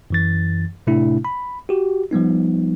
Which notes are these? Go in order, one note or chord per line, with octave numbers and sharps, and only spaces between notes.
F#2 E3 A6
A2 C3 A3 D4 E4
B5
F#4 G4
F3 G3 B3 D#4